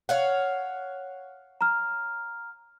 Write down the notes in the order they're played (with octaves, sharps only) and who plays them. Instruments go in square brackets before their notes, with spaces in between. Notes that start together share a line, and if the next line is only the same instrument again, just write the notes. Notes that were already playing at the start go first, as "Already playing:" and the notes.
[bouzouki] C#5 F5 F#5
[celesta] A#5 F6